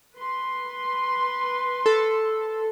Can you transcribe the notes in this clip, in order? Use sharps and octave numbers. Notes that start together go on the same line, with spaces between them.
B4 C6
A4